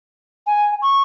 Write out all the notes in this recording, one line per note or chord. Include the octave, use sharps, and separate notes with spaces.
G#5
C#6